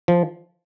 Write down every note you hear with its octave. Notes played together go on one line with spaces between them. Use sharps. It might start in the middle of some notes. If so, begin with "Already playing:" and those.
F3